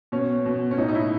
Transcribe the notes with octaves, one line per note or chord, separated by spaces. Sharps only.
B2 C#4
B2
C#4
A2 D#4
D#4
E4